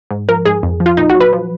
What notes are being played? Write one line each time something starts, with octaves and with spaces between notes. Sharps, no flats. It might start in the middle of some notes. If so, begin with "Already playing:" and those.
G#2
F3 A#4
G#2 G#4
F2
F3
F4
A#2 D#4
F#4
F#3
B4
F3